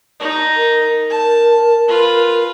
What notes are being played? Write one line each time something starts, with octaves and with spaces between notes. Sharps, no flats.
D#4
A#4
A5
F4 B4